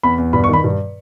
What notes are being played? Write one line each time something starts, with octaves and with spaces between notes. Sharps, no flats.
E2 B5
E2
G2 B5
C#6
D#3
B5
G2